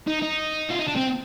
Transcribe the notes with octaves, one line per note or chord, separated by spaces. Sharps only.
D#4
D#4
F4
D#4
D4
C4